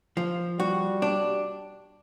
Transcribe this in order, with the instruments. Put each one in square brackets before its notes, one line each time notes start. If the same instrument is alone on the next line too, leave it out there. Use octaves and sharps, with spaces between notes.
[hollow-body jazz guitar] F3
[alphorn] G3 [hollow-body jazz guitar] F#4
[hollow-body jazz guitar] D4